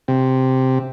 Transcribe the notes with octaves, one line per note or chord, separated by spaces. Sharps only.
C3